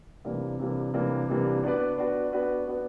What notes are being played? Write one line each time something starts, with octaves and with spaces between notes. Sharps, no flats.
C3 E3 G3 A#3 D4
C3 E3 G3 A#3 D4
C3 E3 G3 A#3 D4
C3 E3 G3 A#3 D4
B3 D4 F#4 B4 D5
B3 D4 F#4 B4 D5
B3 D4 F#4 B4 D5
B3 D4 F#4 B4 D5